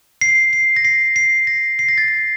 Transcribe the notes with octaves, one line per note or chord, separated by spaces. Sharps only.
C7
C7
A#6
C7
C7
A#6
C7
A#6
A6
A#6